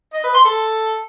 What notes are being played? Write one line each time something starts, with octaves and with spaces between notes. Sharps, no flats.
D#5
B4
C6
A4